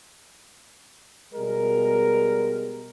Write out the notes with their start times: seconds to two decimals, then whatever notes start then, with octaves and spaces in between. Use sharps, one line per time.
1.34 B2 G3 G#3 A#4